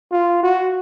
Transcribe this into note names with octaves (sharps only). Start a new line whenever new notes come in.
F4
F#4